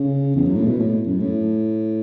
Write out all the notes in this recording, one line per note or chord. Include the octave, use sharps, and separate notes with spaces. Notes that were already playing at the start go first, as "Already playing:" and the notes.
Already playing: C#3
E2
F#2
A2
B2
A2
F#2
A2